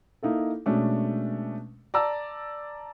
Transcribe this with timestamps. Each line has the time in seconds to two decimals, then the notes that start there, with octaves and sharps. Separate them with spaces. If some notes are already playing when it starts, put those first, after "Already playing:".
0.23 A#3 D#4 E4 A4
0.66 B2 G#3 A3 C#4 D4
1.94 D5 A5 A#5 E6